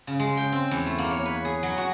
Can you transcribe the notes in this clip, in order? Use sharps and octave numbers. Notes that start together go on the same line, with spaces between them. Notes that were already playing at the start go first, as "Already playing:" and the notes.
C#3
G#3
G5
C4
E2
A3
A#3
C#5
B4
G#4
F#3
F#4